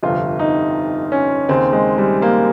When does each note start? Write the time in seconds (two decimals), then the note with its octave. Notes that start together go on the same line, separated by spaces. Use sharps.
0.03 G1 F2 C3 F4
0.39 D#4
1.12 C#4
1.49 D#2 C#3 C4
1.73 G#3
1.98 G3
2.22 A#3